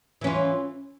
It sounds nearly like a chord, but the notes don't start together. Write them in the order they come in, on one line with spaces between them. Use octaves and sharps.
E3 C#4 F4